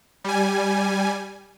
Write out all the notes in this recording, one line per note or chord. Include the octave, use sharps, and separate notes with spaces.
G3 G#5